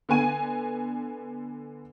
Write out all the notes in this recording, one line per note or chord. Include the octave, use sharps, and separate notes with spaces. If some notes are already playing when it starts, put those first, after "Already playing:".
D3 B3 G#5 D#7